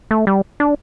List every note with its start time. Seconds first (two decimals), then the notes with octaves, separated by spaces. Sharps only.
0.11 A3
0.27 G3
0.60 D4